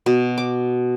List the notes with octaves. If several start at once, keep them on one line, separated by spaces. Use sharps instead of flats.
B2
D6